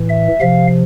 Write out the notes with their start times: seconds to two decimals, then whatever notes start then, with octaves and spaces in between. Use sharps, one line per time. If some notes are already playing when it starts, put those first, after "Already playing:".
Already playing: A2 E3
0.09 E5
0.40 C3 F3 F5